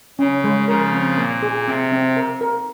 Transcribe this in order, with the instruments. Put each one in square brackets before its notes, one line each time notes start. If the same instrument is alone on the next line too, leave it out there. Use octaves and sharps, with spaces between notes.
[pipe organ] C#3 [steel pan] C#4
[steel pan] G#3
[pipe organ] C#3 F3 [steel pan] A#4
[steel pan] C4
[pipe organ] A#2 [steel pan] A#3
[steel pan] G#4
[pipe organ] C3 [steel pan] C4
[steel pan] C4
A#4
A#4